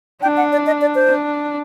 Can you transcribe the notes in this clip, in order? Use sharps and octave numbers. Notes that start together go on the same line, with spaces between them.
D4 G5
F#5
D5
D#5
D5
C5
D4